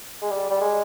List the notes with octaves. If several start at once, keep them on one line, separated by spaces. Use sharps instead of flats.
G#3
G3
G3
G#3